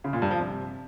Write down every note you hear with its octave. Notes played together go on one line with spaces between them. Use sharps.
C#3
A#2
G2
F3
C3